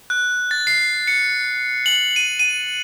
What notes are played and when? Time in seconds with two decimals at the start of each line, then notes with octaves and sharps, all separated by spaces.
0.10 F#6
0.51 A6
0.67 C7
1.08 C#7
1.86 F#7
2.16 D#7
2.39 D#7